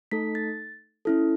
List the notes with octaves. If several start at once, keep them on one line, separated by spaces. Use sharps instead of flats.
A3 D#4 A4 B6
A6
C#4 E4 A4